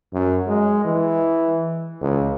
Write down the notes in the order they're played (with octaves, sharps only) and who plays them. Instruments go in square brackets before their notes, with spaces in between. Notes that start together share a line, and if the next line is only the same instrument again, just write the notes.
[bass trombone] F#2
G#3
E3
C#2